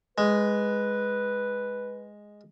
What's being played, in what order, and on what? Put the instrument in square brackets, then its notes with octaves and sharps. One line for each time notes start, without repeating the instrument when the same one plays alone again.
[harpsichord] G#3 [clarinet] B4